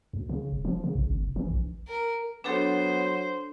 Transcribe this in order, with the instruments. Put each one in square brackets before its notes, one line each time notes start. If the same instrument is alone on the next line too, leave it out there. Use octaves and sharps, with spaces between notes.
[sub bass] D2
C#3
E1
F3
C#3
A#1
G#1
F1
E3
A#1
[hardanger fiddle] A#4
[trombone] F#3 [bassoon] B3 [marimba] D4 A4 C#5 [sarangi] C5